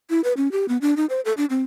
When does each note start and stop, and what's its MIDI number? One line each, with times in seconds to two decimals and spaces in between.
0.10 0.21 64
0.24 0.33 71
0.37 0.51 61
0.52 0.66 67
0.69 0.77 59
0.81 0.94 62
0.97 1.06 63
1.10 1.21 72
1.25 1.33 69
1.37 1.45 62
1.50 1.63 60